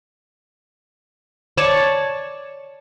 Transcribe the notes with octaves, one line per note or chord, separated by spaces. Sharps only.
C#5 D5 A5